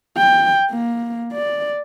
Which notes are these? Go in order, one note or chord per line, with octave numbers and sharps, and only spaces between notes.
G5
A#3
D5